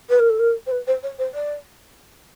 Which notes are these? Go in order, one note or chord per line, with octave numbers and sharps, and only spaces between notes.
B4
A#4
A4
A#4
C5
B4
C5
C#5
C5
D5